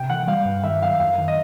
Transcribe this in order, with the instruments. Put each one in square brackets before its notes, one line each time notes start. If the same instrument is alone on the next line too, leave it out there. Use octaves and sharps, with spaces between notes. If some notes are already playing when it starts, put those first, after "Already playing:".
Already playing: [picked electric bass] C3 [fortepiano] G5
[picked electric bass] E3 [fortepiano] F#5
[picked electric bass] G3 [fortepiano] F5
[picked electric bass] G2
[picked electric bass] D#3 [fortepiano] E5
[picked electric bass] F#3 [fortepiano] F5
[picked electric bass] F#2 [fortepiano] F5
[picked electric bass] D#3
[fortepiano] D#5